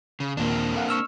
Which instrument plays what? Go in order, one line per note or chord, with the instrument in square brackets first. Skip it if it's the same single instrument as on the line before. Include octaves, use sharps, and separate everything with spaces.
[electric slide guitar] C#3
[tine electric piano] D#2 A#2 [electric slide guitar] A#3 C4 D4
[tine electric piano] A4 F5 F#5
C#6 E6 F6